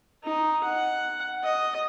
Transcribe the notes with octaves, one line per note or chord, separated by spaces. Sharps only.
D#4
F#5
D#5